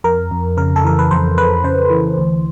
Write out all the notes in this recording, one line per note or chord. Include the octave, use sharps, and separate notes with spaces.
F2 A#4
F2
C#3 A#4
A4
E3 A#4
B4
F2 C5
F2 B4
C#3 C5
E3
D2